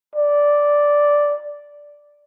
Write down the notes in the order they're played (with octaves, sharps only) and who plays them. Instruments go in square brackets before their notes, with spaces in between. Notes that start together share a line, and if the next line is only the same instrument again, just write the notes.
[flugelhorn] D5